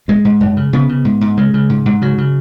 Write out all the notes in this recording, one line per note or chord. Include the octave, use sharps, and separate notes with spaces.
G#2 G#3
G#2
F#2
C#3
C#3 B3
C#3
G#2
G#2
C#3 G#3
C#3
G#2
G#2
C#3 F#3
C#3